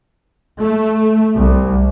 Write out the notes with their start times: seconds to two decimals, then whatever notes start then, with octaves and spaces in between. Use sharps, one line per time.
0.59 A3
1.38 C2